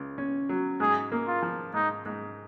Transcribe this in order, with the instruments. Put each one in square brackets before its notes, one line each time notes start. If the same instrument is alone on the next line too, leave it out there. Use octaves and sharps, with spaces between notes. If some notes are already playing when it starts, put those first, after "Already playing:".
Already playing: [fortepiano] C#2
C#4
F#3
[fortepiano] G#2 [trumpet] G#4
[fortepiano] A#3
[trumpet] F4
[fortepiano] F3
[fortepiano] G#2 [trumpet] D#4
[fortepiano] G#2